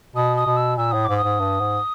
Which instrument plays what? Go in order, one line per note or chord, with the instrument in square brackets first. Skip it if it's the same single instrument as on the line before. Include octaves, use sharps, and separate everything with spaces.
[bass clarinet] B2 [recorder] D#6
[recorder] D#6
[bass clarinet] B2
[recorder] E6
[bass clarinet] A#2 [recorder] E6
[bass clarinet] A2 [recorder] D#6
[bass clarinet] G#2 [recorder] D6
[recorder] D#6
[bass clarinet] G#2
G2
G#2